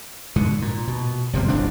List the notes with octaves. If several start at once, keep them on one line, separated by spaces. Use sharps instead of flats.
G#2 B2 D3
A#2
B2
G1 C3 F3 G3
D#1 A1 F3 D4